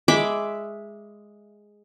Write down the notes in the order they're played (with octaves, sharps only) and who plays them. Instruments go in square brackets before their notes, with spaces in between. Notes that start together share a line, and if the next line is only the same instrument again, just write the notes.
[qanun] G#3 E5 B5 D6